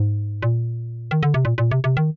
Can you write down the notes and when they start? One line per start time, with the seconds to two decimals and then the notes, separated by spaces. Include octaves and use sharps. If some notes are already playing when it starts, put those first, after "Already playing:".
Already playing: G#2
0.43 A#2
1.11 D#3
1.23 D3
1.34 C3
1.45 A#2
1.58 A#2
1.71 C3
1.84 C3
1.97 D#3